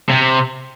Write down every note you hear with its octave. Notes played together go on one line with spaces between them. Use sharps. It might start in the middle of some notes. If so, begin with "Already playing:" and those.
C3